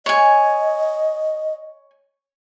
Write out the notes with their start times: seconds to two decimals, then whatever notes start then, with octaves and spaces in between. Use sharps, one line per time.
0.06 C#5 D#5 G#5